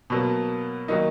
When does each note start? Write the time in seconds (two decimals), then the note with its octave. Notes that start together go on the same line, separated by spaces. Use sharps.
0.10 B2 F#3 A#3
0.88 D#3 F#3 A#3 D#4